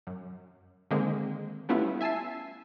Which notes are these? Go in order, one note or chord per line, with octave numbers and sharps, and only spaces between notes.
F#2
D3 D#3 G#3 A#3 C4
G3 A3 B3 C#4 E4 F4
E5 G#5 A5 E6 C7